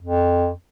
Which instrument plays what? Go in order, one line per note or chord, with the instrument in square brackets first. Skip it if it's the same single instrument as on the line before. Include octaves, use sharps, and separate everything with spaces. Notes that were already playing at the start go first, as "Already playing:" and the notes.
[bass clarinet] F2